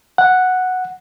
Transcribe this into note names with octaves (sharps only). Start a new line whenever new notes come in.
F#5